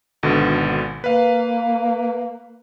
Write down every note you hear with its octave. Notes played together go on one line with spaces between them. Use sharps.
G#1 B2 D3
A#3 B4 F5